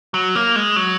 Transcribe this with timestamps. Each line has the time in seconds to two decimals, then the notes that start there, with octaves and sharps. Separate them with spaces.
0.14 F#3
0.35 A#3
0.56 G#3
0.76 F#3